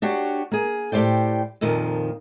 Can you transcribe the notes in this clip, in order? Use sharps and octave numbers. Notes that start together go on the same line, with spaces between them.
D4 F#4 G4 C#5
A#3 G#4
A2 G4 C5 D5 G5
F2 A#2 D#3 F3